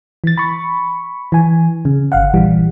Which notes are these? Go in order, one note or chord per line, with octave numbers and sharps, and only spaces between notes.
E3 A6
B5 C#6
E3 G#5
C#3
G1 F5 F#5
A#1 E3 G3